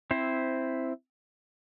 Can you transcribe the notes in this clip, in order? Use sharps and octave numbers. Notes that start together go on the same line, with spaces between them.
C4 E4 C5